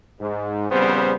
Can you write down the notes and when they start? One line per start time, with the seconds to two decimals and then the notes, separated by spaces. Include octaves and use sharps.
0.20 G#2
0.71 A#1 C#3 G3 B3 C4 C5